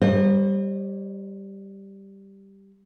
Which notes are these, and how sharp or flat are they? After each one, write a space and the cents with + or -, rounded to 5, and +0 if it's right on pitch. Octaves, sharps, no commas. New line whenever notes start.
G3 +0 C5 +40 D#5 -30